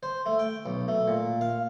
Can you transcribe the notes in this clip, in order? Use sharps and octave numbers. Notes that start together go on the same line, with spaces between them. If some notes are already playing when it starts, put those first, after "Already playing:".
C5
A3
G5
B1
A3
A#2
F5